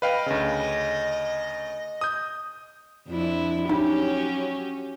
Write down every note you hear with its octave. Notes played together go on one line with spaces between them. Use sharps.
B4 D#5 F5 G5
D2 C#3
D#6 G6
F2 D4 E4
F#3 C#4 D#4 G4